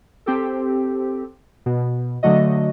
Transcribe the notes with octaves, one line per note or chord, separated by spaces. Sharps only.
C4 G4 A4
B2
D3 F#3 A3 F#4 D#5